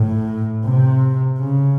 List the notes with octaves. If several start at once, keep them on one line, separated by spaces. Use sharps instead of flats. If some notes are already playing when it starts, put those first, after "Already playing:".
Already playing: A2
C3
C#3